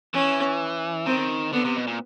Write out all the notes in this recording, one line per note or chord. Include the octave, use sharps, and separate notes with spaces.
E3 C#4
D#3 C4
D3 B3
C3
B2
A#2